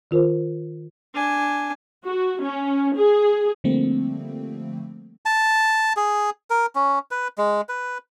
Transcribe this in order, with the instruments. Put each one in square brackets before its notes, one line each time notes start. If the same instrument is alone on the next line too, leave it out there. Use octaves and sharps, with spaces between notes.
[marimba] D#3 F4 A#4 C5
[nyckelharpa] D4 G#5
[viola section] F#4
C#4
G#4
[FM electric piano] D3 F3 G3 A3 A#3 C4
[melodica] A5
G#4
A#4
C#4
B4
G#3
B4